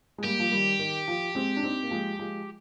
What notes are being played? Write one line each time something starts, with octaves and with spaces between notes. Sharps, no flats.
G#3
G3 A#3 G4
F3
D#3 G3
D#3
F3
G#3 C4
D4
C4 D#4
A#3
F3 G#3
F3 G#3